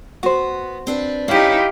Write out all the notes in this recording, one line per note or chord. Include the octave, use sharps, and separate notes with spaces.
B3 F#4 C5
C4 D4 B4
C#4 D#4 E4 G4 B4 F5